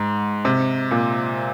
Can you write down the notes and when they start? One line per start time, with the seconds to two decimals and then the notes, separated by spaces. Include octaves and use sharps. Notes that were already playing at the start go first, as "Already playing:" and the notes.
Already playing: G#2
0.45 C3
0.91 A#2